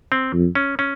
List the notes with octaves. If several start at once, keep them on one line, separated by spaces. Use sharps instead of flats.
C4
F2
C#4
C#4